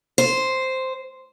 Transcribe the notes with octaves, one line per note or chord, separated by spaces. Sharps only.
C5